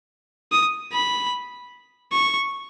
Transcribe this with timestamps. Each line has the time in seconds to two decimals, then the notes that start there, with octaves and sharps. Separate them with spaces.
0.52 D#6
0.93 B5
2.13 C#6